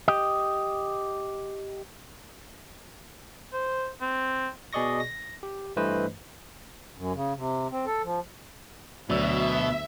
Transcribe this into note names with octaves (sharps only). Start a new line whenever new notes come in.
G4 D#5
C5
C4
B2 G#4 D5 D#5 C#6 A#6
A#6
G4
G2 E3 A3 B4 C5 D#5
F#2
C#3
C3
C4
A4
F3
D2 B2 F#3 D5 E5 E6